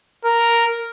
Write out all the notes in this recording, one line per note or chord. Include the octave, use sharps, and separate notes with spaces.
A#4